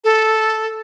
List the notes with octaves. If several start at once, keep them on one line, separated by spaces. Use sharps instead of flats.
A4